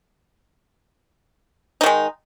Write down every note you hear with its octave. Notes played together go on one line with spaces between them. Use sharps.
D#3 G#3 D#4